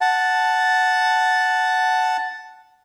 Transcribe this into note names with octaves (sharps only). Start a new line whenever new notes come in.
F#5 A5